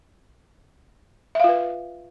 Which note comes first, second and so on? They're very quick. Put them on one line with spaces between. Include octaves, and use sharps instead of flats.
E5 F5 F4 B4